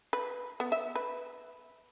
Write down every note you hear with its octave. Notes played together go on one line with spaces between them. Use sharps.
B4
B3
E5
B4